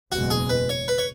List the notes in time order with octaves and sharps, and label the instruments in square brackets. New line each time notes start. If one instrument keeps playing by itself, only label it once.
[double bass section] F#1 E2 B2 G#3 [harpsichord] F#4
[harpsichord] G#4
B4
C#5
B4
C#5